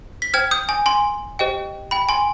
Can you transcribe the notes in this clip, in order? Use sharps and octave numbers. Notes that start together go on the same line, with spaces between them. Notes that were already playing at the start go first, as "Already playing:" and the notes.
B6
C5 G5 F6 G#6
D#6 G6
G#5
G#5 C6
G4 C5 D#5 G5
G5 B5
G#5 C6